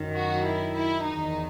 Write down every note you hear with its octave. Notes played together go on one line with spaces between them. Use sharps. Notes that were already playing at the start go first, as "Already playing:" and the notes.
Already playing: F#2 D#3
F#4
E4
E4
E2 D#3 D#4